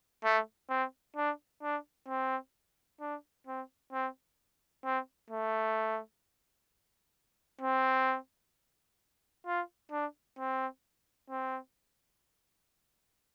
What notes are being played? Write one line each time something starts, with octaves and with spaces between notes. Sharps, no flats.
A3
C4
D4
D4
C4
D4
C4
C4
C4
A3
C4
F4
D4
C4
C4